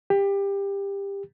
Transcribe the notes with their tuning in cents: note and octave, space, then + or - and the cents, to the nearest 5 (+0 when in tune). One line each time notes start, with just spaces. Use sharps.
G4 +20